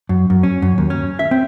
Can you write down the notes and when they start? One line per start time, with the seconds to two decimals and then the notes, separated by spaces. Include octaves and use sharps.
0.09 F#2
0.30 F#2
0.43 C#4
0.62 F#2
0.78 D#2
0.90 C#4
1.19 E5
1.31 C4